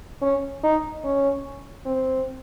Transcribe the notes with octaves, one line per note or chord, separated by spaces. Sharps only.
C#4
D#4
C#4
C4